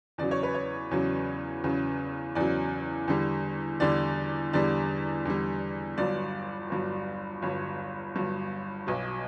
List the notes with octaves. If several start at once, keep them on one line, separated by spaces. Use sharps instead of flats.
E2 C#3 F#3 D5
C#5
B4
C#5
E2 C#3 F#3
E2 C#3 F#3
E2 C#3 F#3 D5
E2 D3 G3
E2 D3 G3 D5
E2 D3 G3 D5
E2 D3 G3
G1 G2 F#3 D5
G1 G2 F#3
G1 G2 F#3 C#5
G1 G2 F#3
B1 B2 F#3